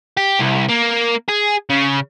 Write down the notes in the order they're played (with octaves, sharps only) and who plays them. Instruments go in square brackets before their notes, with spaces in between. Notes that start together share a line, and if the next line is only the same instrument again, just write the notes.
[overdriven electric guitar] G4
C2
A#3
G#4
C#3